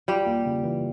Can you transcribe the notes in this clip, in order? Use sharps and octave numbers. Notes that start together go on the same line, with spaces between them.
G3 F4 G4
A#3
C#3
E3